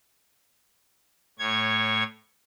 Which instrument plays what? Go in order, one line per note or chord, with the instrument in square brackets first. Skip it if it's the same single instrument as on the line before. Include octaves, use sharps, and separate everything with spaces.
[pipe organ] A2 C#5 G#6